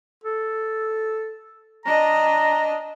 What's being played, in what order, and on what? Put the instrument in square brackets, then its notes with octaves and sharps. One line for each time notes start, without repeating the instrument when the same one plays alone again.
[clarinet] A4
[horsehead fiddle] D4 D#5 [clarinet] A#5